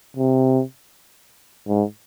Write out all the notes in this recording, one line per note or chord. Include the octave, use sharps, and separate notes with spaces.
C3
G#2